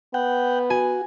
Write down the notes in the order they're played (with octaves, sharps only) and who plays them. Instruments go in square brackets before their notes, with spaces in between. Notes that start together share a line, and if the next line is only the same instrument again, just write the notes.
[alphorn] B3 [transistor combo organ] F#5 G5
[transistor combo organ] F#4 [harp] G#5